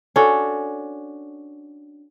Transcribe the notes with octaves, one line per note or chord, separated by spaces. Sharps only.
C#4 D4 F#4 A4